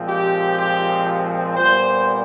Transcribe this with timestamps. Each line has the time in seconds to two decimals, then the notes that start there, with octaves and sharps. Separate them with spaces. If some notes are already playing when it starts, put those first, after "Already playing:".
Already playing: A#2 F3 G#3 C4
0.09 G4
0.58 G4
1.57 A#2 G3 B3 C5